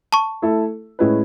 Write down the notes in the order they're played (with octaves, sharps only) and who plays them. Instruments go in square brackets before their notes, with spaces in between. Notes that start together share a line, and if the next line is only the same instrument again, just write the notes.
[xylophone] A5 C#6
[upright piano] A3 E4 A4 E5
A2 G#3 C#4 E4 B4